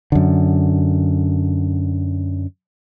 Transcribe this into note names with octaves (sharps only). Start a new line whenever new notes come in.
F#2 D3